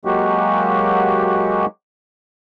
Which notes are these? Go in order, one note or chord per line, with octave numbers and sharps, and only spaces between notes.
F#3 G#3 A#3 F#4 G4